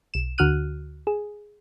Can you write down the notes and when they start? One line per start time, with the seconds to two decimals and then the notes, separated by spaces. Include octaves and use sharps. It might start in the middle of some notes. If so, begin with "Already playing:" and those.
0.14 B1 E7
0.38 D2 D3 F#4 F6 F#6 D#7
1.07 G#4